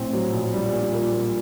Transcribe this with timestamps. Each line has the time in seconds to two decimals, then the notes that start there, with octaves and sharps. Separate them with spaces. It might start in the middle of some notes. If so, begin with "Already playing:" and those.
Already playing: A#1 A2 C4
0.13 F#3
0.33 A#1
0.53 G3
0.73 A#2
0.93 A#3
1.12 A#2